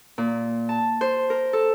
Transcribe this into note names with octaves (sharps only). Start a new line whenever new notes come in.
A#2
A5
C5
A#4
A4